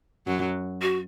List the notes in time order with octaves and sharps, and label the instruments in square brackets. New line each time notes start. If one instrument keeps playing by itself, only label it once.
[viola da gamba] F#2 F#3
[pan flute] F#4